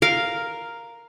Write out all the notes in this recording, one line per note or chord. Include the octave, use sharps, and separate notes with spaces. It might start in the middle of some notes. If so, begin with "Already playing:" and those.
A#4 F5